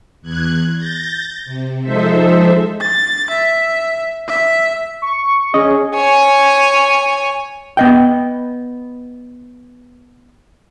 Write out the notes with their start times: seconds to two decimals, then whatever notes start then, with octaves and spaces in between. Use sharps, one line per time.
0.22 E2 F#6 G#6
0.77 G6 A6 A#6
1.45 C3
1.82 F3 G#3 D#4 A4 C5 E5
2.81 A6
3.30 E5
4.28 E5
5.02 C#6
5.54 C#4 G#4 D#5 C#6
5.95 C#5 G#5
7.77 B3 D#5 G5